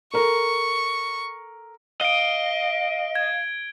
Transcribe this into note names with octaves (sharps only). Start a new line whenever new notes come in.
A4 A#4 C#6
D#5 F5 D7 G7
G#6